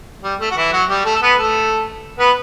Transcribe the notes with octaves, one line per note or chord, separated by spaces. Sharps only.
G3
A3
F#4
E3 E4
F#3 F#4
G3 G4
A3 A4
A4
B3 B4
A3 A4
B3 B4